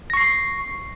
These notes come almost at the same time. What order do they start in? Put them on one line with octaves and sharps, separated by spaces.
A#6 C#6 C7